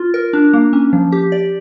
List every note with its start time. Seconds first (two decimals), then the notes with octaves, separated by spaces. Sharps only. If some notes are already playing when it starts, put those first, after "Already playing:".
Already playing: F4
0.14 A#4
0.33 D4
0.53 A#3
0.73 C#4
0.93 F3
1.12 G4
1.32 D5